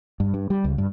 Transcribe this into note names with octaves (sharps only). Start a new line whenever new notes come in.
G2
G2
G3
C#2
G2